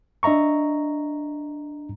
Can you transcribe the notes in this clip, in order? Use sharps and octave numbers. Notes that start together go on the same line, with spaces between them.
D4 D#5 E5 A#5 C#6